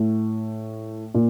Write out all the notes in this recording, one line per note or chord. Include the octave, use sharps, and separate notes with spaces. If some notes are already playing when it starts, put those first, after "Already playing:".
Already playing: A2
A#2